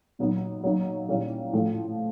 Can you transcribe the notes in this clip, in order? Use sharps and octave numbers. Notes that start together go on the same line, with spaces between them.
A#2 F#3 B3 D#4
F#3 A#3 D#4
A#2 G3 A#3 C#4 E4
A2 F3 A3